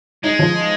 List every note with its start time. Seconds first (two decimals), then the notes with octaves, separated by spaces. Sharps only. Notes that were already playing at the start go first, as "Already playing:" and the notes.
0.23 G#3 D#4
0.39 F3